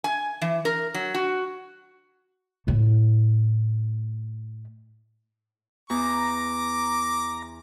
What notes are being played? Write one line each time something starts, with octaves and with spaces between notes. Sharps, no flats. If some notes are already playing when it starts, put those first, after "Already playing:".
G#5
E3
A#4
F#3
F#4
A2 A3
E2 A#5 D6